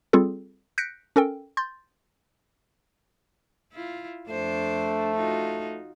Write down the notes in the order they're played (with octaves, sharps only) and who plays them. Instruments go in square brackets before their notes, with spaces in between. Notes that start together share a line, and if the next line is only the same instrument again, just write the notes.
[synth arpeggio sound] G3 C4 F4 G#4 A4
F#6 G6 A#6 B6 C#7 D7
C#4 A4 A#4 G5
C6 G6 A6
[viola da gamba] E4 F4
[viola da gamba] F2 D4 C5 [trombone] A3
[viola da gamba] D#4 F4 F#4